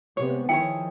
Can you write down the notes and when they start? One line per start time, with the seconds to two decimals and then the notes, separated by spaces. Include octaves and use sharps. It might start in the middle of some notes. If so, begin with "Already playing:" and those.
0.17 C3 G#3 B3 C#5
0.49 D#3 F3 E4 G#4 C#5 G5